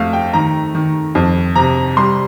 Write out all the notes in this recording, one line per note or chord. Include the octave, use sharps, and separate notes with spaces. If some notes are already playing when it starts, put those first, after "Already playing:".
Already playing: F2 A3 F5
G5
D#3 A#5
D#3
F2
C3 A#5
G3 C6